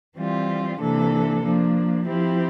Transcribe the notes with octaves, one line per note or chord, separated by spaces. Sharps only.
E3 G3 C4 F4
C3 E3 A#3 D4 A4
F3 A#3 D4
F3 C4 E4 G4